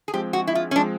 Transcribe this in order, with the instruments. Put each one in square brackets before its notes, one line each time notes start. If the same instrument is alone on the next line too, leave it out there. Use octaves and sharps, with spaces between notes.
[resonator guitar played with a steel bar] G#4
[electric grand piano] F3 G#3 C4 [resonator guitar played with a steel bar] G4
[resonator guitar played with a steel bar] F#4
E4
F4
C#4
[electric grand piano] F3 G#3 C4 [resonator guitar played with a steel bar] D4